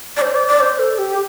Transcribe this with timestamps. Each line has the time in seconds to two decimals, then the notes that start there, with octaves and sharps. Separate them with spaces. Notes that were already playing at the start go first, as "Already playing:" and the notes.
0.17 D5
0.22 C5
0.35 D5
0.47 D5
0.60 C5
0.79 A4
0.98 G4